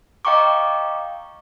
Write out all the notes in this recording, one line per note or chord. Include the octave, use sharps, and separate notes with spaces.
D#5 F5 G5 A#5 C#6 D6